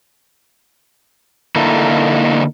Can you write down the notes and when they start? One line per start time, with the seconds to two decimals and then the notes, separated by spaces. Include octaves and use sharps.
1.55 D3 A#3 D#4 E4 A4